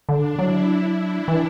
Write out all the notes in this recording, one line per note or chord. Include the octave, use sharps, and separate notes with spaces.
D3 D4
F#3 E4
D4
E3